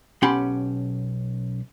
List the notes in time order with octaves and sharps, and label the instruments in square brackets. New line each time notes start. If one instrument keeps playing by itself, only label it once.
[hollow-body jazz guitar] B1 C#4 G4 F#5 B5 C6